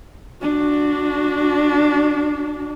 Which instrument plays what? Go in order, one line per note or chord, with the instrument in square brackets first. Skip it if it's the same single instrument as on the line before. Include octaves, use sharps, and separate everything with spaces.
[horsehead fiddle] D4 F#4